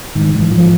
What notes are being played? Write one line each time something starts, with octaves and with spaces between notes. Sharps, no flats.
G#2 D#3
G#2 E3
G#2 F3